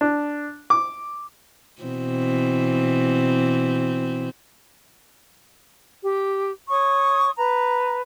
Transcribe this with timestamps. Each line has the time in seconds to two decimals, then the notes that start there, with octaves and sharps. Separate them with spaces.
0.01 D4
0.70 D6
1.82 B2 E3 C4
6.03 G4
6.69 C#5 C#6 D#6
7.36 B4 A#5